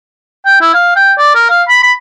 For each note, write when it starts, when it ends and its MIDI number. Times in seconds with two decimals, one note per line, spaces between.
0.46 0.57 79
0.61 0.72 64
0.74 0.96 77
0.96 1.13 79
1.18 1.31 74
1.35 1.49 70
1.50 1.63 77
1.69 1.82 83
1.83 1.93 83